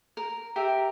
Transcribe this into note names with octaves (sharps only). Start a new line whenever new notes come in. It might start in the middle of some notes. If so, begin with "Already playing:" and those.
A#4
G4 A#4 E5